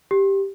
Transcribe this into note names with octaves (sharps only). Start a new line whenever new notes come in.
G4